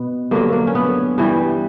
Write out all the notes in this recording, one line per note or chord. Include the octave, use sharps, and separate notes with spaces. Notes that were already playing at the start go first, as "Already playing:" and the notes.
Already playing: B2 B3
G2 D3 F#3 A#3
A#3
C#4
B3
G2 E3 G3